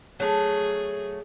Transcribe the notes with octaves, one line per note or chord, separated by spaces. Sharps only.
F#3 A3 G#4